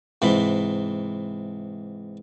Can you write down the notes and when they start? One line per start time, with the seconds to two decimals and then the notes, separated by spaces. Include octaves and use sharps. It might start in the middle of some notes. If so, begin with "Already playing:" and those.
0.22 G#2 C3 E3 B5